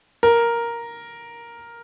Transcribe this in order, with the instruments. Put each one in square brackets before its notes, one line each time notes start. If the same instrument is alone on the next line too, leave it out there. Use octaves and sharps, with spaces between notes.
[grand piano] A#4